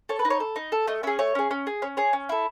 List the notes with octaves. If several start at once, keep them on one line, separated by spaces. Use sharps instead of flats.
A4 C#5
B4
D#4
C#5
A4
D#4
A4
A3 D#5
C#4 G#4 E5
A3 C#5
C#4 G#4
C#4
G#4
C#4 C#5
G#4 C#5
C#4
E4 A4